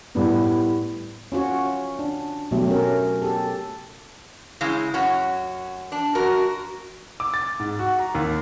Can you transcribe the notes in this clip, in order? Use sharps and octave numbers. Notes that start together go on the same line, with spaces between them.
A2 G3 B3
C#4 F4 F#4 C#5
D4
B2 F#3 A3 G4
C#4 A#4
G4 A4
C#3 G#3 E4
F#2 C#4 F#4
D4
F#2 F#4 A#4
D6
A6
G#2
F#4
A#5
D#2